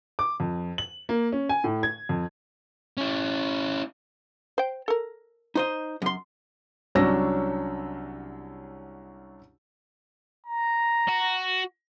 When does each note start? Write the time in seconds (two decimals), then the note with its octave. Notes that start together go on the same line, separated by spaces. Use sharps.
0.19 D6
0.40 F2
0.78 F#7
1.09 A#3
1.32 C#4
1.49 G#5
1.64 A2
1.83 G#6
2.09 F2
2.97 C#4 E4
4.58 C5 G5
4.88 A4 A#4
5.55 D#4 C5 D#5
6.02 F#2 C6
6.95 C2 F#3 C#4 D4 E6 A#6
10.46 A#5
11.08 F#4